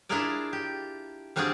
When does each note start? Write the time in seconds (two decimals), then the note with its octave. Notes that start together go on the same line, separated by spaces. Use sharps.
0.09 D4 E4 F4 G#4 A#4 D5
0.53 G4
1.36 G3 C4 D4 F4 F#4 G#4